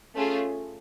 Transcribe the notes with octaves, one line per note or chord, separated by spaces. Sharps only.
A3 C#4 F4 G#4